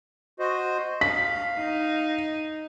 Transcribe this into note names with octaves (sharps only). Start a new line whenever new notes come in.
F#4 C5 D#5
F5 B6
D#4